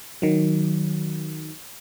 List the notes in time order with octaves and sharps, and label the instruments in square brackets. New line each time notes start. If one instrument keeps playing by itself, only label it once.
[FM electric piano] D#3 F#3